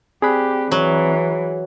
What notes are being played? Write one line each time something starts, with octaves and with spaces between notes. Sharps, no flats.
C4 G4 G#4 D5 B5 F#6
E3 F#3